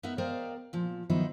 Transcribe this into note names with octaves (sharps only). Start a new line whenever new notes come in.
B3 D#4 A#4 E5 F#5
A#4 C5 D5 D#5 F5 G5
A#2 F3
D#3 F3 F#3 B3 D#4 E4